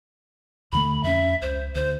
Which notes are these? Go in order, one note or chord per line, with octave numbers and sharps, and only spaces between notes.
D#2 D3 A3 B5
F2 C#4 E5
C#2 C5
D2 C5